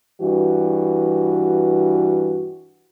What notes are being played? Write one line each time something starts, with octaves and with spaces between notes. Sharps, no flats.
G2 E3 F#4